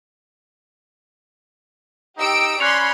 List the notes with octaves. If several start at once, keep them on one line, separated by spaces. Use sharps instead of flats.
D#4 G4 E6 D7
C#4 D5 B5 C6 F#6 C#7 F7